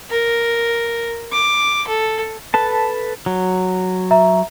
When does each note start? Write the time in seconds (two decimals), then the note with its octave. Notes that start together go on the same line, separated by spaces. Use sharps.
0.11 A#4
1.32 D6
1.88 A4
2.54 A4 B4 A5
3.26 F#3
4.11 E5 A#5